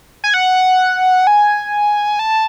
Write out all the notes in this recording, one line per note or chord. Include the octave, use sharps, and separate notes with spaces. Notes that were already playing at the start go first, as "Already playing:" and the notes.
G#5
F#5
G#5
A5